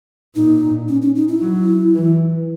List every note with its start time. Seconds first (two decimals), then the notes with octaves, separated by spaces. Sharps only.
0.35 A#2 D#4
0.88 C#4
1.02 C#4
1.15 D#4
1.28 E4
1.41 F#3
1.96 E3